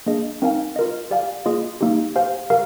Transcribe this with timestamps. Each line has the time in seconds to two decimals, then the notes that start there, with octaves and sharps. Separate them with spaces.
0.06 A#3 D4 G#4 D#5
0.42 C4 D#4 A#4 F5 G#5
0.76 F4 A#4 D#5
1.11 G4 D5 F5 G#5
1.46 A#3 F4 G#4 D#5
1.81 A#3 D#4 G4
2.16 G4 C5 F5 G#5
2.50 G4 A#4 F5